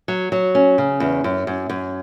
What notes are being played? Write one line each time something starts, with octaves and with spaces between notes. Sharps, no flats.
F#3
F#3
C#4
C#3
E2
F#2
F#2
F#2